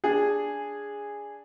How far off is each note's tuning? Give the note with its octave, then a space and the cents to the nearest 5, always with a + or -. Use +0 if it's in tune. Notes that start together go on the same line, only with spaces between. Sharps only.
D4 -10 G#4 -10